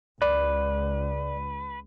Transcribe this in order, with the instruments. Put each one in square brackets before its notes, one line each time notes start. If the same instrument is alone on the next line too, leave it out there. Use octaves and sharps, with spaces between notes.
[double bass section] C#2 [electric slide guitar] B4 [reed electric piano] D5